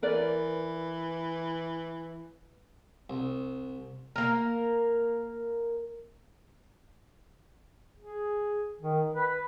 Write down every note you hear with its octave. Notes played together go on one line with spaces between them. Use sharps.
E3 A#4 B4 D5
C2
A#3 A#4
G#4
D#3
B4